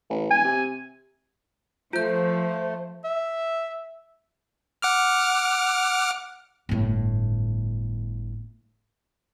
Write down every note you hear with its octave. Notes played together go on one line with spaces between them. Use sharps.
A1
E1 G#5
C3
F3 A3 F4 C5 G6
E5
F#5 D6 F6
G1 A2